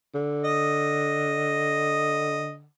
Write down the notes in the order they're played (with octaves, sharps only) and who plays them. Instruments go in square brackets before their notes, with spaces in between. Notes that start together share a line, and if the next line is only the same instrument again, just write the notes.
[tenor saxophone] D3
[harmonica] D#5